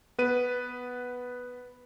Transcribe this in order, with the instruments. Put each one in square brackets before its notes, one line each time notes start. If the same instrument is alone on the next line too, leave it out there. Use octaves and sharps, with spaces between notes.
[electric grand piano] B3 B4 D#7